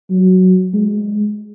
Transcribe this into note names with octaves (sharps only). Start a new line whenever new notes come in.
F#3
G#3